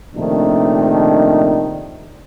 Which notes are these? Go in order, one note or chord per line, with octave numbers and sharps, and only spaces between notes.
A#1 C3 D#3 A3 D4 D#4